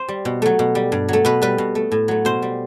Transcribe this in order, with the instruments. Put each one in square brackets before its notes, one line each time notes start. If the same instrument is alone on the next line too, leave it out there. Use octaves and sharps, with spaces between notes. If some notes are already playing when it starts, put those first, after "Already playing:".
Already playing: [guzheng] C5
G3
B2
F#3 A3
B2
G3
G2
F#3 A3
B2 B4
G3 B4
B2
A3
A2
F#3 A3
B2 C5
G3